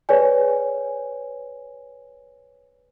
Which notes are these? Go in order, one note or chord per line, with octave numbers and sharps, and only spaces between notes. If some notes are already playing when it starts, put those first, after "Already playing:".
G#4 B4 C#5 D5 G#5